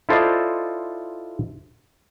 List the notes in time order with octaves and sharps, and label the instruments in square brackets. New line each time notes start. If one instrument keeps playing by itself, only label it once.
[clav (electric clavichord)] E4 F4 A4 C5 D5 D#5